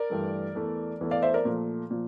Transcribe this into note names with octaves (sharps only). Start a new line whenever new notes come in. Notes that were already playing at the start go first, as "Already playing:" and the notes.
Already playing: A#4 D5
G2 E3 A3
E2 E3 A3
E2 E3 A3
D5 F5
C5 E5
A#4 D5
A#2 F3 A3
A#2 F3